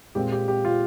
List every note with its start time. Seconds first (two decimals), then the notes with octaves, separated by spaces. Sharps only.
0.15 A#2 G#3 C4 G4
0.32 G4
0.48 G4
0.65 F4